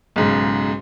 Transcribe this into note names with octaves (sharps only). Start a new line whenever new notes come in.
B1 G#2 C#3